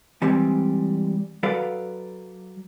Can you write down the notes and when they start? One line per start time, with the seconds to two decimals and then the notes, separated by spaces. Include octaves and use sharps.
0.22 E3 G3 G#3 C4
1.43 F#3 A4 B4 D5 F5